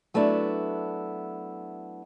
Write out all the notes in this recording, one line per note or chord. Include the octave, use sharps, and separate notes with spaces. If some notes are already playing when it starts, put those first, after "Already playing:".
F#3 A3 B3 D4 E4